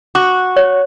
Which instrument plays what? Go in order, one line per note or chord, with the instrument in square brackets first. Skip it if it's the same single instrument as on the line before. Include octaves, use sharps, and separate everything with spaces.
[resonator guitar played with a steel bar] F#4 [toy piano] D6
[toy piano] C#5